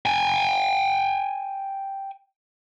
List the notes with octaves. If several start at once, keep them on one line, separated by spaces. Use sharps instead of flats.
G5 G#5